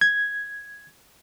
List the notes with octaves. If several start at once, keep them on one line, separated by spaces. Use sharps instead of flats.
G#6